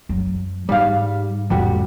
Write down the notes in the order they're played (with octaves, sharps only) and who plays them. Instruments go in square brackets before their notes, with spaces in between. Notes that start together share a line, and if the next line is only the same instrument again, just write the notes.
[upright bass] F#2 F#3
[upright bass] G#2 [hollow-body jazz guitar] G3 F5
[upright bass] F2 A2 [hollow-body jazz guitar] D3 G3 F#4